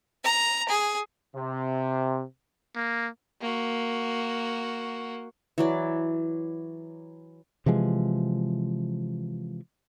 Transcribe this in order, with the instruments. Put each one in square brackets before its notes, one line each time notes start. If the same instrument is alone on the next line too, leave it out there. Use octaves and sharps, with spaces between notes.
[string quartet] A#5
G#4
[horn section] C3
[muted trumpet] A#3
[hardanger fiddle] A#3 F#4
[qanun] E3 F#3 D5
[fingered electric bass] C3 E3 F3 G#3